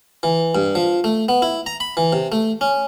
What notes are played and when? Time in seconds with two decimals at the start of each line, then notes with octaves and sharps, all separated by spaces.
0.23 E3
0.55 G2
0.75 F3
1.04 A3
1.29 B3
1.42 E4
1.66 A#5
1.80 B5
1.97 E3
2.13 C3
2.32 A3
2.61 C#4